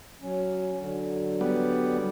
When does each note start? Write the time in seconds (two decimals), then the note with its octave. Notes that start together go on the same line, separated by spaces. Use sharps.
0.22 F#3 C#4
0.79 D3 F#3
1.41 G3 B3